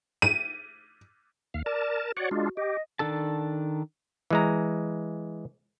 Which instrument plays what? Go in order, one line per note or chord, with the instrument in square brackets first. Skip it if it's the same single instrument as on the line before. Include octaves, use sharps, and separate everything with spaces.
[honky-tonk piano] D#7
[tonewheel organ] D#2 F5
[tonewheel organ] A#4 A5 [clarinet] D5
[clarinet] F#4 [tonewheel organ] C#5 D5 F#5
[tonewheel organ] G#3 D4 F4
[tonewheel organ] G4 [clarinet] D#5
[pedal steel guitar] D#3 D4 A4 A5
[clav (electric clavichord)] E3 G#3 A#5